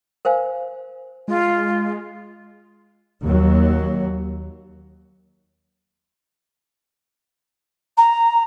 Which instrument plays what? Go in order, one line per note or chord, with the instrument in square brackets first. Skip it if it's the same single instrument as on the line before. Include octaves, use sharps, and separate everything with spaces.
[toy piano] A#4 C5 F5 G#5
[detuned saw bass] G#3 [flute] F4
[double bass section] D#2 F#3
[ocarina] A#5